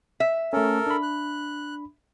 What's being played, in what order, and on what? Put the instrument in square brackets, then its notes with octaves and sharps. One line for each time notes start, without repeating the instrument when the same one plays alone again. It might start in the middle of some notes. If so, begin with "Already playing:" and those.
[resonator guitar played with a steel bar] E5
[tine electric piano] A3 C#4 [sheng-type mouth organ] A4 A#4
[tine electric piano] D4 B5
[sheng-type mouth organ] F#6